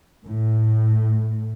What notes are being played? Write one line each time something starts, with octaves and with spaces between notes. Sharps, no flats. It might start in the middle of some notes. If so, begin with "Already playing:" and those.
A2